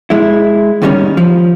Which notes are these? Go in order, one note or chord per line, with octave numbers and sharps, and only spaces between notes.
G#3 E4
D#2 G#2 D#3 G3 C#4
F3